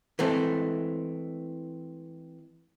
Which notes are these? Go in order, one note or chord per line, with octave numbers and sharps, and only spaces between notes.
E3 G#3 A3 C4